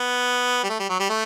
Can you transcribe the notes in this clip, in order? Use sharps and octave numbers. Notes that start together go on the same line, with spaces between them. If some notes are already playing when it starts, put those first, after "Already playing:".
Already playing: B3
G3
A3
G3
F#3
G3
A3